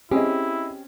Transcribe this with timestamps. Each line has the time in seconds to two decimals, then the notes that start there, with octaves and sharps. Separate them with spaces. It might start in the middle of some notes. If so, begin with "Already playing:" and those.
0.11 C4 C#4 E4 G4 G#4 D#5